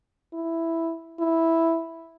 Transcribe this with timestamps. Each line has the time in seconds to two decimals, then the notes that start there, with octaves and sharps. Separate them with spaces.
0.33 E4
1.20 E4